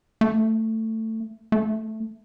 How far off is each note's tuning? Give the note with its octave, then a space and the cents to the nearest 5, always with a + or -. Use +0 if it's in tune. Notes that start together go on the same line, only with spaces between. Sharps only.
A3 +15
A3 +0